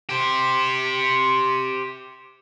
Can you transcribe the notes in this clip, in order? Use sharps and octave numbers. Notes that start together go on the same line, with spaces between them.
G4 C5